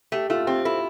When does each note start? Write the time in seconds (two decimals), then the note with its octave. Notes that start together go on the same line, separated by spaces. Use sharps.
0.12 A3 G4
0.30 A3 F4
0.47 C4 G4
0.65 E4 A4